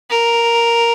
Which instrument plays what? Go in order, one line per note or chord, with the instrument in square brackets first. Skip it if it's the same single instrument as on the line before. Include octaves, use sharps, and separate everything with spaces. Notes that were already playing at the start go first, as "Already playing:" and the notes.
[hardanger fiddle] A#4